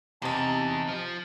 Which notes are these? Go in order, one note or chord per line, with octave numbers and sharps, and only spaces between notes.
E2 C3 D#4 A5
F3